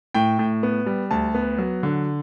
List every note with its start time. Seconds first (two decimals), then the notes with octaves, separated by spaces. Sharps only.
0.14 A2 G5
0.39 A2
0.63 B3
0.86 G3
1.11 D2 A5
1.35 B3
1.58 F#3
1.83 D3